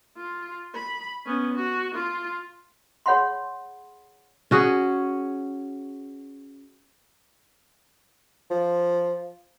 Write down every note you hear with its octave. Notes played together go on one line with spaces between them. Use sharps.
F4
B5
B3 C#4
F#4
F4
G#4 C#5 F#5 B5 C6
C#4 F#4 G#4
F3